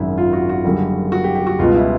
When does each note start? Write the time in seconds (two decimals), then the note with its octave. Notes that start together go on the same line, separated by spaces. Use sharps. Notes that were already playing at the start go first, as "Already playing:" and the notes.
Already playing: G#1 F#2 C#3 E4
0.18 F4
0.33 F#4
0.49 F#4
0.65 F#1 F#2 D3 G3
1.12 F#4
1.24 G4
1.35 G4
1.47 F#4
1.59 C#2 B2 G3 F4
1.75 E4